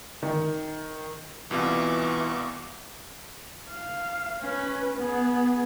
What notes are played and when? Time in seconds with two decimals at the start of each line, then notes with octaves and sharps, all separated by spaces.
0.23 D#3
1.51 C2 B2 E3 F4 C#6 D6
3.71 F5
4.42 C#4 B4
4.95 B3 G#4